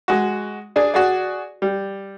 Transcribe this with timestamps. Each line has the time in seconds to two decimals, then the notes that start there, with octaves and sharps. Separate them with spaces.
0.08 G#3 F#4
0.76 D4 G#4 D5
0.94 F#4 G#4 D5
1.62 G3